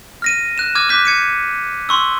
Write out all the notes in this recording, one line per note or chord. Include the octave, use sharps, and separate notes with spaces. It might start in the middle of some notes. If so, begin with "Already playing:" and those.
F6 A#6 D#7
F#6 E7
D6 F6 G#6 D#7
D6 F#6 G6 B6
G#6 C#7 D#7
C6 C#6 E6